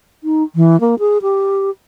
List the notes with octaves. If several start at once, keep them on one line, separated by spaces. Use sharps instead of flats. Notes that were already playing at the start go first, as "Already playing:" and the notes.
D#4
E3
A#3
G#4
G4